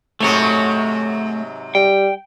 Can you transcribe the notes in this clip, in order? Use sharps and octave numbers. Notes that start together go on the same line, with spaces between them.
G#2 C3 F#3 A3 C#5
G3 G5